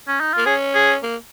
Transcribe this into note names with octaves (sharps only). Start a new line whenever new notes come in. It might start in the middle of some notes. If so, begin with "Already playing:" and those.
C#4
D#4
A#3 F4
C#4 G#4
G#4
A#3